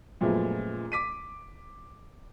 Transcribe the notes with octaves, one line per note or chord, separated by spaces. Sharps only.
F#2 A#2 F3 G#3 A3 B3
D6 B6 D#7